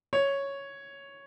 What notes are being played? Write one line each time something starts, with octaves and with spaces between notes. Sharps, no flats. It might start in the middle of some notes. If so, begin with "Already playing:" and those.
C#5